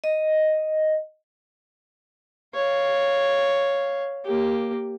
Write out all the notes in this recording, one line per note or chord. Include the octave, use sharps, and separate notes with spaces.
D#5
C#5 F5
A#3 G4